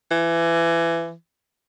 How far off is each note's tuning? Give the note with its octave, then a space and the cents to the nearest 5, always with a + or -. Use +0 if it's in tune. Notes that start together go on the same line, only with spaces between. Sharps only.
E3 +25